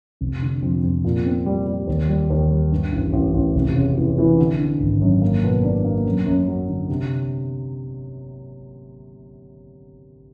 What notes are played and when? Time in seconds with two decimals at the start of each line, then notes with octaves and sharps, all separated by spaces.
0.21 F1
0.42 D3
0.62 F2
0.84 F2
1.04 A#2
1.26 C4
1.46 G3
1.66 G3
1.87 D#2
2.08 G3
2.30 D#2
2.51 G3
2.72 G2
2.92 A1
3.13 A1
3.34 A1
3.55 F1
3.76 C#3
3.97 E3
4.18 E3
4.38 D3
4.59 D3
4.80 G#1
5.01 F#2
5.21 A#3
5.44 B2
5.64 D4
5.85 A#3
6.06 F#2
6.26 F#2
6.48 F#3
6.69 D3
6.89 C3